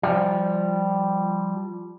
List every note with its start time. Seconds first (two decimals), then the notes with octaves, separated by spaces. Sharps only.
0.03 F3 G3